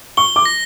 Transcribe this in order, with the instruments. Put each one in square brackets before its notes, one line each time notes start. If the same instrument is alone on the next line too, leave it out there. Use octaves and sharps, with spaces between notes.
[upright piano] C#6 [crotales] G7
[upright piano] D6
[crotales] A#6